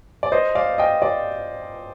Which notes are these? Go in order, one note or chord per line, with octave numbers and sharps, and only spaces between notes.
D5
C5 D#5
D5 F5
D#5 G5
D5